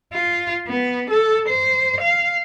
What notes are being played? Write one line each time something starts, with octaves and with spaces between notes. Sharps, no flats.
F4
B3
A4
C5
F5